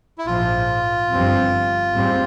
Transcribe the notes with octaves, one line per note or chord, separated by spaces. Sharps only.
E4
A#1 G#2 F3 F4
G1 G2 F3 C4
G#2 G3 C4